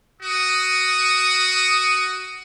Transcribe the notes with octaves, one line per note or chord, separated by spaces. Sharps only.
F#4 D#6